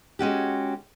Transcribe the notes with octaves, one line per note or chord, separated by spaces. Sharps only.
G#3 C#4 F#4 G4